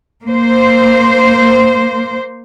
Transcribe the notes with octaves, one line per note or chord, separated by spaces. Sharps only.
A#3 C5